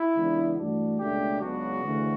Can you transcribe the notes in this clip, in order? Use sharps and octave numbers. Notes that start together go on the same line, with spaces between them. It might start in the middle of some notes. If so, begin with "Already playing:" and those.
Already playing: E4
C#2 C#3 E3 B3 D4
G2 E3 A3 D4 F#4
C#2 B2 A3 D4 G4
C#2 C#3 F#3 B3 D4 F#4
D2 C#3 E3 A3 C#4